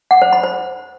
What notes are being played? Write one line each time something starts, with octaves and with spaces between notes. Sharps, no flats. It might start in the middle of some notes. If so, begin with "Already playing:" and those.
F#5
C5
B5
C5